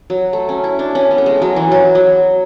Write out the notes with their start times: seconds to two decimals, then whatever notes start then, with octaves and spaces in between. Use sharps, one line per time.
0.10 F#3
0.33 A3
0.49 C#4
0.64 E4
0.79 D4
0.95 C#4
1.11 B3
1.18 A3
1.26 G#3
1.42 F#3
1.56 E3
1.72 F#3
1.95 F#3